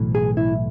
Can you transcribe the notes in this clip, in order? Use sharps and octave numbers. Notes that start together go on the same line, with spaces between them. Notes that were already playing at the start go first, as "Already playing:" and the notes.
Already playing: B1 A2 E3
G#4
E4